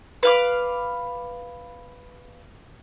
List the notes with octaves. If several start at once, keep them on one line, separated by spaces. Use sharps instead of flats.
B4 F5 D6